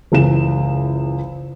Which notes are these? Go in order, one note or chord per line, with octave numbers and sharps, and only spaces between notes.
F#1 C#2 E3 E7